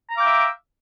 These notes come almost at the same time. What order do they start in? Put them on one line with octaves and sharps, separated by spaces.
A#5 F5 D6 G5 E5